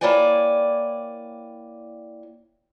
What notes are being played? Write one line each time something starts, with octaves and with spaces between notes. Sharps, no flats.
A#3 E4 C#5 D5 G5 G#5